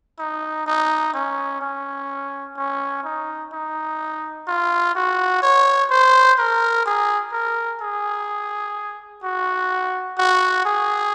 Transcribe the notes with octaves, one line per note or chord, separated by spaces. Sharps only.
D#4
D#4
C#4
C#4
C#4
D#4
D#4
F4
F#4
C#5
C5
A#4
G#4
A#4
G#4
F#4
F#4
G#4